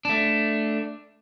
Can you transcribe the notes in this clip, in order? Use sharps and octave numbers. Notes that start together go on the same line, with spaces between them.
A3 D4